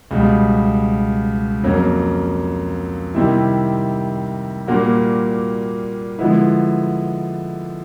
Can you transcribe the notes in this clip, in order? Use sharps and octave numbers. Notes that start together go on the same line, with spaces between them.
C#2 B2 G3
F2 C#3 F#3 A#3
C3 D#3 G3 C4 E4
A#2 G3 A#3 D4 F#4
D3 F3 G#3 B3 E4